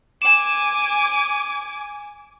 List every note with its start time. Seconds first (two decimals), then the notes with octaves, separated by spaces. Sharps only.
0.22 G#5 D6 E7